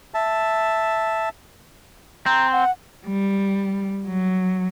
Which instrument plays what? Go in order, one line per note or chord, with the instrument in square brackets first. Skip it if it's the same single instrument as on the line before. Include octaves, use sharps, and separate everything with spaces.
[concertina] E5 A5
[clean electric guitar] C4 [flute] A#5
[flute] F#5
[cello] G3
F#3